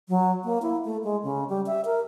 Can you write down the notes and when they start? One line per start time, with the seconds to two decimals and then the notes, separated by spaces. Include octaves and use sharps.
0.09 F#3
0.44 A#3
0.62 E4
0.85 A3
1.03 G#3
1.23 C#3
1.49 G3
1.66 E5
1.85 A#4